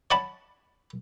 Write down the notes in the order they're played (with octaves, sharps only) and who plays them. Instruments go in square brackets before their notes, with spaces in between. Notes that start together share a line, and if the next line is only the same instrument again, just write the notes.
[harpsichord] C#5 D5 F#5 A5 B5